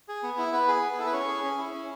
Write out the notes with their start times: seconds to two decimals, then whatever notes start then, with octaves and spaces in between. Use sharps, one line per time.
0.09 G#4
0.23 B3
0.38 E4
0.53 B3 B4
0.68 G#4
0.83 B3
0.93 G#4
0.98 E4 A4
1.07 B4
1.13 C#4 C#5
1.28 G#4
1.44 C#4
1.58 E4
1.74 C#4